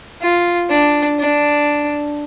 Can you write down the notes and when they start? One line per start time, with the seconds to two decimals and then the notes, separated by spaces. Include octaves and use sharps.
0.22 F4
0.70 D4
1.19 D4